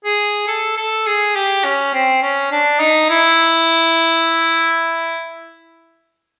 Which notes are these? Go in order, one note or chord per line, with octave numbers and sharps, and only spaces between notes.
G#4
A4
A4
G#4
G4
C#4
C4
C#4
D4
D#4
E4